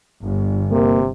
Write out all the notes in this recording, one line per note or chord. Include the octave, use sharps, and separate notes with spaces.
G1
C3 A#3